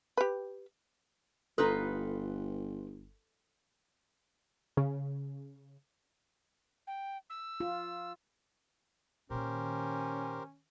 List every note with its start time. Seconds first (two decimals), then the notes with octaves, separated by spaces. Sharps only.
0.17 G4 B4
1.58 G1 D#4 F4 A4 B4
4.77 C#3
6.87 G5
7.30 E6
7.60 F4
9.30 A#2 D#3 C#4 G4 A#4 C5